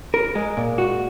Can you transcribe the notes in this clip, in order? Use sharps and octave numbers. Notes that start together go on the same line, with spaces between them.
A#4
G#3
A#2
F#4